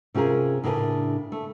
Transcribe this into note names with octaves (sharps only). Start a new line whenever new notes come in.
C3 C#4 F4 G#4 A#4
A2 C#3 D4 A#4 G#5
A3